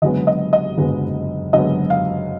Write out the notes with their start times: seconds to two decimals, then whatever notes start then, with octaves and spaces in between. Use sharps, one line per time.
0.02 F#1 F#2 D3 G#3 B3 D#5
0.27 D#5
0.53 D#5
0.77 F#1 F#2 D3 G#3 B3
1.53 F#1 F#2 D3 G#3 B3 D#5
1.90 F5